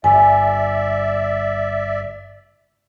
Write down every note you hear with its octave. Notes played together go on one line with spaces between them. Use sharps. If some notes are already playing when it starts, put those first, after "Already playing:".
G1 D5 E5 G#5